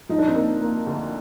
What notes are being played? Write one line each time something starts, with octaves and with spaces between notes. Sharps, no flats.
F3 D#4
D4
C4 D#4
A#3
A#3
D2